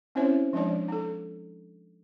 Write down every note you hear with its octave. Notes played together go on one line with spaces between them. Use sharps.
C4 C#4 E4 C5 C#5 E5
F3 G#3 D4 C#5 D5
D#4 A4